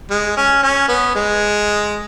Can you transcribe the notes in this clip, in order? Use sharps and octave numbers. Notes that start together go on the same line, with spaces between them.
G#3
C#4
C#4
B3
G#3